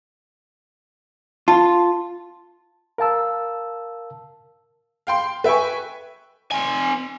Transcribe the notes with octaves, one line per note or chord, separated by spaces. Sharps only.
F4 A5
A#4 F5 A5 E6
F5 G5 C6
B4 E5 G5 G#5 C#6
C4 G#5